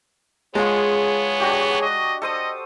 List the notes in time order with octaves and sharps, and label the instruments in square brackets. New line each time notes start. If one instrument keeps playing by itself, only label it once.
[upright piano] G#3 [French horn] B3 [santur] F4 A5 [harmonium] G#4 C#5
[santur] D4 F#4 G4
[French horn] D#5
[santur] A4 C5 D#6 [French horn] D#5